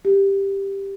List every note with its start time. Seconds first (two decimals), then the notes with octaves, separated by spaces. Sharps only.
0.05 G4